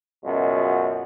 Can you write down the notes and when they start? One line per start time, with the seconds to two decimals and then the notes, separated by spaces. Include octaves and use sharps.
0.24 C#2 F#2 B2